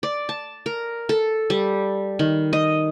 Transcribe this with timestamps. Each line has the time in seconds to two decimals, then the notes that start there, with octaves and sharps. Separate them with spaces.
0.03 D5
0.29 A5
0.66 A#4
1.09 A4
1.50 G3
2.19 D#3
2.53 D#5